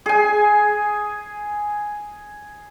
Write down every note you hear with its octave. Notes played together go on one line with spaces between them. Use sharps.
G#4 G#5